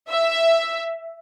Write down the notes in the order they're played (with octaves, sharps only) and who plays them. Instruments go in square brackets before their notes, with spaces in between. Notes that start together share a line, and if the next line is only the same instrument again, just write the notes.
[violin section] E5